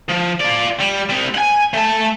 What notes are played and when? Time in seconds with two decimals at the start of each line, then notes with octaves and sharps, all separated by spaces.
0.09 F3
0.40 F4 D5
0.79 G3
1.09 G3 C4
1.34 F#5 G#5
1.74 A3 A5